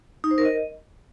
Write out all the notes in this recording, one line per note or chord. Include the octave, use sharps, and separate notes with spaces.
D#4
C5
A#4
D#5